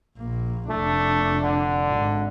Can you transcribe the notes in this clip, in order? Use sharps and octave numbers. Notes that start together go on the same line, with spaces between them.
A#1 A#3
F1 A3 D4
D3
G#1